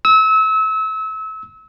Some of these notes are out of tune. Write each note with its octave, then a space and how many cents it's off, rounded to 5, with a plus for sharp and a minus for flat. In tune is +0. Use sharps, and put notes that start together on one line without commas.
E6 -30